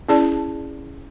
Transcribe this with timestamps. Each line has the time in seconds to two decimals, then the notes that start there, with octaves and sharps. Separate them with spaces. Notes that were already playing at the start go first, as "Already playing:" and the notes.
0.09 C#4 E4 G#4 D5 A5